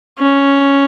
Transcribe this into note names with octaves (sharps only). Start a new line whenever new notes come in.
C#4